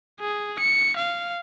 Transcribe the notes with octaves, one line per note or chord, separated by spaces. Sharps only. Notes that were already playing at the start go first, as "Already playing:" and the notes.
G#4
C#7
F5